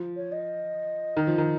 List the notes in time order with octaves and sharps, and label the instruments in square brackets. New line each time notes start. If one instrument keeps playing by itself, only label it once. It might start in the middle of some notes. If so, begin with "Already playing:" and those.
Already playing: [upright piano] F3
[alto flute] C#5
D#5
[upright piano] D#3
F3
D#3